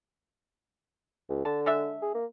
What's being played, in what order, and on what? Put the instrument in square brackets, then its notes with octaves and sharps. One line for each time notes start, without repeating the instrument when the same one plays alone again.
[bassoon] C#2
[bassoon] D3 [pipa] A5
[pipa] G#3 D4 E5
[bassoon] G#4
A#3